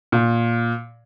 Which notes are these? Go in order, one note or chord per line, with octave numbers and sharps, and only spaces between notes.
A#2